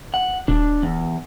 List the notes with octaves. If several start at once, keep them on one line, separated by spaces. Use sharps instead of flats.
F#5
D#1 D4
E2